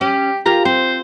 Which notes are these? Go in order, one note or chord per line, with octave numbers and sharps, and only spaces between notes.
C#4 G4
F4 G4 A#4 A#5
C4 C5